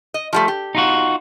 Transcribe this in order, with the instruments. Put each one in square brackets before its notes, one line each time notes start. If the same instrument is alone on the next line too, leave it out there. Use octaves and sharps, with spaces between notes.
[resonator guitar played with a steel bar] D#5
F3 G3 A3
G4
[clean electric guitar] D#4 F4 F#4